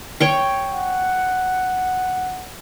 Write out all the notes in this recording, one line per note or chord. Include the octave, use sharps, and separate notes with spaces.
C#5 G5 C#6
F#5